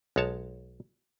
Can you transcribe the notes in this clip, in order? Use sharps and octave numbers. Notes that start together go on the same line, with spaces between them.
B1 G#3 C#5 A5